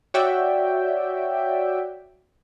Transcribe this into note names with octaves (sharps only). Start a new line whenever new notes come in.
F#4 C#5 D5 E5 G5